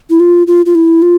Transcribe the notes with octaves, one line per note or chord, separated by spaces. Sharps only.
E4
F4
F4
F4
E4
F4